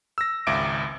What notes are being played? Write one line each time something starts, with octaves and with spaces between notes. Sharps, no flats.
E6 A#6
G#1 C#2 E5 D6 D7